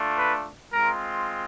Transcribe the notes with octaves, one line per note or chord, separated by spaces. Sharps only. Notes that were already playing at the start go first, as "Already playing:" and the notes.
Already playing: A3 D4 F4
B4
G#3 C4 F4 A#4